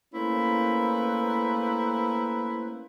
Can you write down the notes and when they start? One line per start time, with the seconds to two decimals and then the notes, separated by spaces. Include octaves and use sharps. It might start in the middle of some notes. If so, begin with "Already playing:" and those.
0.14 A3 A#3 C#4 E4 B4 C5